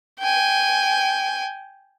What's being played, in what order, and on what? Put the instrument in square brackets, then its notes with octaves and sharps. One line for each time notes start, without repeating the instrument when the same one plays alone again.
[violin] G5 G#5